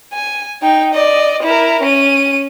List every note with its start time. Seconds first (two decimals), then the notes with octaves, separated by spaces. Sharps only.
0.12 G#5
0.62 D#4 G5
0.94 D5 D#5
1.43 E4 A#4
1.82 C#4 D#7